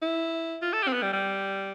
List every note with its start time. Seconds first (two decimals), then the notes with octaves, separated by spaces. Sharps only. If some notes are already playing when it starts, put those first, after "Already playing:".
0.02 E4
0.62 F4
0.73 A4
0.82 G4
0.88 C4
0.93 B3
1.02 G3
1.13 G3